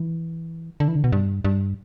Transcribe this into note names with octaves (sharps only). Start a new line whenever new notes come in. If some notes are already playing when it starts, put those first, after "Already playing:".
Already playing: E3
D3
E3
D3
B2
G2
G2